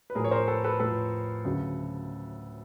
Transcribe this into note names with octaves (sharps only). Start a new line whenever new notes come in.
B4
A2 F3 G#4 A#4
C#5
A#4 C5
A4 B4
A4 B4
A2 F3 A4 B4
D2 C#3 F#3